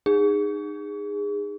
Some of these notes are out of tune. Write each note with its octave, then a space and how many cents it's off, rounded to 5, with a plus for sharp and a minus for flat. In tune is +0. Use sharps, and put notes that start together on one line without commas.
D#4 -25 G#4 -20